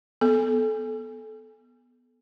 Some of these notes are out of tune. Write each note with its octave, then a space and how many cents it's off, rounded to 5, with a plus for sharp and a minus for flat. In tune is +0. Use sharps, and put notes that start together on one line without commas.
B3 -5 A4 -20